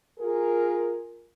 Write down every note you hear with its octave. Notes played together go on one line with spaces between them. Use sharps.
F4 G#4 A#4